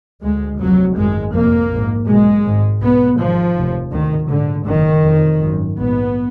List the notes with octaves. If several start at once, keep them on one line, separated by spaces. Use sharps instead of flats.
D2 G#3
F1 F2 F#3
G#1 F#2 G#3
F1 F2 A#3
A#1 G#2
B1 B2 G#3
G#1 G#2
B1 B2 B3
G#1 G#2 F3
F1 D#2
D2 D#3
A#1 G#2 D3
F#1 F2 D#3
F1 F2
G#1 F#2
A#1 G#2 B3